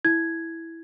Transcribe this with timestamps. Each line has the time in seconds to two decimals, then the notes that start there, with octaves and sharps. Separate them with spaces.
0.05 E4 G#6